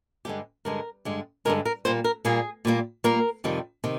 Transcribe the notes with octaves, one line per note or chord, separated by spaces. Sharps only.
G2 D3 G#3 G4
G2 D3 G#3 A#4
G2 D3 G#3
G2 D3 G#3 A#4
A#4
A#2 G3 A#3 C5
A#4
A#2 G3 A#3 G#4
A#2 G3 A#3
A#2 G3 A#3 A#4
F2 C3 D#3 G3
C3 D#3